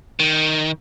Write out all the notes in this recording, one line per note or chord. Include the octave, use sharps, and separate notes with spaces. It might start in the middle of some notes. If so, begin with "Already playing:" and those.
D#3